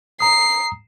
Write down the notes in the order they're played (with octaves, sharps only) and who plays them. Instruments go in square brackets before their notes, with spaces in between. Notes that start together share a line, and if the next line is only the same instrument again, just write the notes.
[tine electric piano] A#5 D#6 [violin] C7